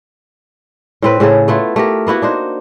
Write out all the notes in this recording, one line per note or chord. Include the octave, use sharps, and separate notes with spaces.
A2 C4 B4
A2 C#3 G#4 A4
A3 B3 E4 F4
A3 G4 A#4
A#3 B3 E4 F#4
D4 D#4 C5